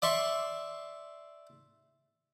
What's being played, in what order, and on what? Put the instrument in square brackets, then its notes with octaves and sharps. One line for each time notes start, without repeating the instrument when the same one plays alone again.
[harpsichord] D5 E5 C6 C#6